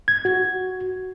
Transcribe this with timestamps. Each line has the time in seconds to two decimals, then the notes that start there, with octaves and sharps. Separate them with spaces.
0.08 G#6
0.25 F#4